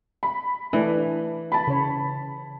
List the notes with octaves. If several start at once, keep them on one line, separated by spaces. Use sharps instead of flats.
B5
E3 A3 D4
A5 B5
C#3 C#5